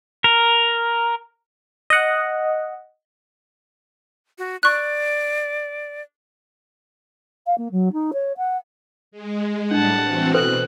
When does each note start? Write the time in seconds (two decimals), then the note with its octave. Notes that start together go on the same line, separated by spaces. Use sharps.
0.24 A#4
1.90 D#5 F#5
4.38 F#4
4.63 D5 C#6 F#6
7.46 F5
7.58 A#3
7.72 F#3
7.93 D#4
8.13 C#5
8.37 F#5
9.12 G#3
9.71 A2 G3 D4 F#5 A5
10.02 E3 C4 F#4
10.34 B2 A4 B4 C5 F#6